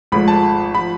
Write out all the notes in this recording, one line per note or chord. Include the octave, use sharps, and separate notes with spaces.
G#1 G#2 F3 A3 B5
A5
F3 B5